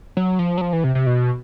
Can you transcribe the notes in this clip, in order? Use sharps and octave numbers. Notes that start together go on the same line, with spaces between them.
F#3
F3
F#3
F3
E3
C3
C3
B2